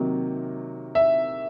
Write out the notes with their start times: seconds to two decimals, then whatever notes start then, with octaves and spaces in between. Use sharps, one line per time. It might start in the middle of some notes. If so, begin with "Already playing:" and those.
Already playing: C3 D#3 F#3 A#3
0.95 E5